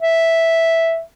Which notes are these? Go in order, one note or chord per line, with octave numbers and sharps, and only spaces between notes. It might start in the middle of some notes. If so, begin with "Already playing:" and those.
E5